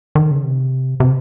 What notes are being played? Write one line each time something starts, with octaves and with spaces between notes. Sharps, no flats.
D#3
C#3
C3
C3